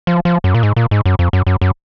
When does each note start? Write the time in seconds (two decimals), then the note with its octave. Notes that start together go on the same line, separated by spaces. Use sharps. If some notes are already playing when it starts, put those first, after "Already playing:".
0.07 F3
0.25 F3
0.44 F#2
0.55 A#2
0.63 G#2
0.76 A#2
0.91 G#2
1.06 F#2
1.19 F2
1.33 F#2
1.47 F#2
1.61 F#2